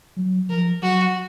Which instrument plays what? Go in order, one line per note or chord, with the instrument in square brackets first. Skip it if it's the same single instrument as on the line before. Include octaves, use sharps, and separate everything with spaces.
[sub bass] F#3
[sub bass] F3 [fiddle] A#4
[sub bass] F#3 [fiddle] F#4